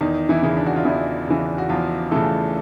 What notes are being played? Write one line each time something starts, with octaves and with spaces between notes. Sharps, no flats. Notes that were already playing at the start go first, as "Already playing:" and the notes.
E2 D#3 D#4
E3 E4
C#3 E3
D4
F#4
F4
E2 E3 E4
C#3 E3
F#4
E2 F3 F4
C#3 E3 A3 A4